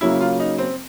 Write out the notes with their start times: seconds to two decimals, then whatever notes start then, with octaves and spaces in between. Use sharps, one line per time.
0.01 C#3 F#3 A#3 E4
0.21 F4
0.40 D#4
0.58 C4